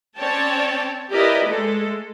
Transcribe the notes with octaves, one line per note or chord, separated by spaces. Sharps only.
C4 C#4 C#5 D5 G5 A5
E4 G4 A#4 B4 D5 D#5
G#3 A3 A4